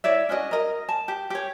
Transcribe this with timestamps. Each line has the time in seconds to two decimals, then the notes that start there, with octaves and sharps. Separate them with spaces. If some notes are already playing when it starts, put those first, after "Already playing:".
0.04 E4 C#5 D5 E5
0.29 C#4 D4 F#4 D#5
0.51 A#4 D#5
0.89 A5
1.08 G4
1.30 G4 C#5